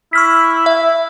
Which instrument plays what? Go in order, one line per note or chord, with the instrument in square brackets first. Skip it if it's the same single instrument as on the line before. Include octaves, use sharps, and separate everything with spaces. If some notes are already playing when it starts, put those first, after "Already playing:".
[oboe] E4 [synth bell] C#6 F6 B6
[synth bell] E5